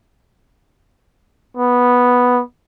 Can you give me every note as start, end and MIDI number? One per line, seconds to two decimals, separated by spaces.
1.57 2.41 59